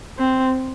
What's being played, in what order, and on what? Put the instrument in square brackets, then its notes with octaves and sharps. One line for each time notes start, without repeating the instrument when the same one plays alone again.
[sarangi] C4